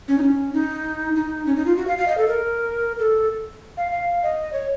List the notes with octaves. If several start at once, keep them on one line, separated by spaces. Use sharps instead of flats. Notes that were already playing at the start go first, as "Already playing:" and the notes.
C#4
D#4
C#4
D#4
D#4
C#4
D#4
F4
F#4
F5
F5
D#5
A4
A#4
A4
F5
F5
D#5
C#5